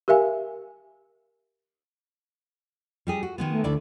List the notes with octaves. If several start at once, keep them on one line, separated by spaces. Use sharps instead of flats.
G4 A#4 E5 F5 G#5
G3 G4 G#4
F#4
D#3 G#3 B3
A3
D2 D3 E4 D5